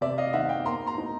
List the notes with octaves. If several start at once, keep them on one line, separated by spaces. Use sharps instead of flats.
C3 D5 E5
D#5 F5
D#3 E5 F#5
F5 G5
A#3 A#5 C6
A#5 C6
D#4